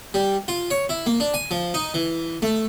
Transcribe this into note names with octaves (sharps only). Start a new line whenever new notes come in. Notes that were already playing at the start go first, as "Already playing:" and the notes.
G3
F4
C#5
E4
A#3
D4
G#5
F3
D#4
E3
A3